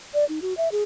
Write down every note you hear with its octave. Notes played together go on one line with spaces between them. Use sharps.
D5
D#4
F#4
E5
G#4